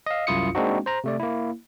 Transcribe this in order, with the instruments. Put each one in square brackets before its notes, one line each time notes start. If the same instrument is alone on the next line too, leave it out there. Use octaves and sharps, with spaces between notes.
[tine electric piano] D#5 F5
C2 F#2 E4 F4 D#6 C#7
G#3 A#3 C4 D4 D#4 F#4
C5 A#5
C3 A3 D5
A#3 E4